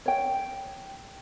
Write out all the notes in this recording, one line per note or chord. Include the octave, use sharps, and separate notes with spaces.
C#5 G5